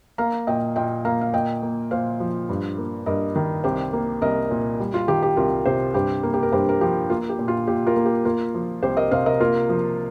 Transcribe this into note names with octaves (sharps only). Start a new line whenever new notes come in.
A#3 F5 A#5
A#2 D#5 G5
A#2 D#5 G5
A#3 F5 A#5
F5
A#2 D#5 G5
A#3
A#2 C5 F5
F3
G2
A#3
G2 A#4 D#5
D#3
C2 G4 C5
A#3
C2 A#4 D#5
A#2
G3
F4
D#3 G4
G4
C2 F4 A#4
C3 G4 C5
G2 G4 C5
A#3
G4
A#4
G2 G4 C5
A#4
F3 G4
A#3 F4
G4
A#2
F4
A#2 G4
F4 A#4
A#3
G4
A#3 F4 A#4
F3
C2 G4 C5
A#4 D#5
C3 C5 F5
A#4 D#5
A#3 F4 A#4
F3